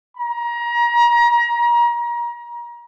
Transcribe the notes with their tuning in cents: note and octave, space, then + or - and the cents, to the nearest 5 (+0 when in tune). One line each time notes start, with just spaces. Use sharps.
A#5 +30